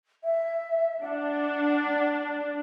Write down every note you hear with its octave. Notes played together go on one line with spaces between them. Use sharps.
E5
D4 F#5